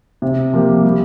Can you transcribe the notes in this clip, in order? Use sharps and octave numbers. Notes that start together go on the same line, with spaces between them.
C3
F3 A#3 G4
G3